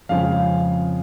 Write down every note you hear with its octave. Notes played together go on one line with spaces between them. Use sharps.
F2 C#3 F3 G#3 C4 F5